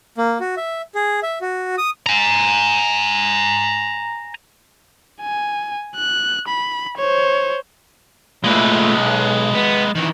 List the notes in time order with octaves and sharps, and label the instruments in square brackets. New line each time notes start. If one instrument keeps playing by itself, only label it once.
[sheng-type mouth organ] A#3
F#4
E5
G#4
E5
F#4
D#6
[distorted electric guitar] G#5 A#5
[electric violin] G#5
F#6
B5
C5 C#5
[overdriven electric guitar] A#2 A3 [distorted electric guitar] G#3 B4
[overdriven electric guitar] B1
B3
D#3 E3